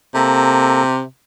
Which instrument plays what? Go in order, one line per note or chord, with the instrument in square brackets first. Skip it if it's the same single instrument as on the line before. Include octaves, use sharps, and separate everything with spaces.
[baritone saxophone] C3 [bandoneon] A#3 A4 A#5